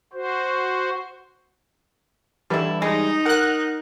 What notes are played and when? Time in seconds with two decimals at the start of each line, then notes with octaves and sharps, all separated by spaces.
0.13 F#4 C5
2.50 D3 E3 G3 E4
2.82 G#3 D#4
3.25 A#4 F#5 F#6